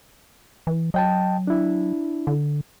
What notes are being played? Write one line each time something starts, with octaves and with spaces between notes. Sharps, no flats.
E3
F#3 D#5 G5 A5
D4 E4
D3